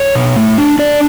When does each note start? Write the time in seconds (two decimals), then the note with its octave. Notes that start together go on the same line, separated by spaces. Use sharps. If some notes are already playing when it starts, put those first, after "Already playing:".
Already playing: C#5
0.15 B2
0.36 A3
0.58 D4
0.79 D4 D5